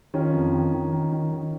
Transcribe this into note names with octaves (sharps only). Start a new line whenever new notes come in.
D#3 C#4 F4
F2
D#3
D#3
D#3
D#3
D#3